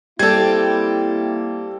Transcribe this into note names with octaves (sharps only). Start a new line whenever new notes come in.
G3 A#3 C4 E4 G4 A4 G#6